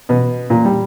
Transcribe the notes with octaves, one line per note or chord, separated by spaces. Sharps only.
B2
A#2
G3